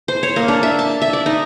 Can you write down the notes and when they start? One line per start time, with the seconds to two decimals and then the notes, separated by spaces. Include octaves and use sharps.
0.08 C5
0.23 C#5
0.36 A#3
0.48 D4
0.63 E5
0.79 A5
1.02 E5
1.13 D5
1.26 D#4